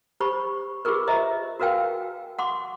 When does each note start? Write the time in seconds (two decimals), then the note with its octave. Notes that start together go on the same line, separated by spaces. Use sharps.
0.20 G4 C5 B5 C#6
0.85 F4 G4 G#4 A#4 B4
1.07 C5 D#5 E5 A#5
1.60 F#4 A#4 B4 F5 G5 G#5
2.39 F#5 C6 D6